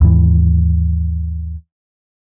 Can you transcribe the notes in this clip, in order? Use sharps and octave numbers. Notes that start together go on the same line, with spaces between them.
D#2 G#2 E3